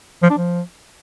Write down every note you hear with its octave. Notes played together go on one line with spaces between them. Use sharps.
F3
D4
F3